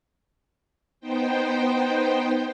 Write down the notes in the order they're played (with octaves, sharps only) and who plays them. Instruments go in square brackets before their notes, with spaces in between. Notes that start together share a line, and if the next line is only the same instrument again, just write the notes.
[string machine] B3 D#4 C5 G5